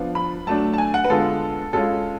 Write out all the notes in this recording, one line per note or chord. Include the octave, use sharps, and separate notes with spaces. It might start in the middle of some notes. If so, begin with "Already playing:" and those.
Already playing: F3 B3 D4 F4
B5
F#3 A3 D4 A5
A5
G#5
F#5
B4
D3 G#3 B3 F4 A4
C#3 G#3 C#4 F4 A4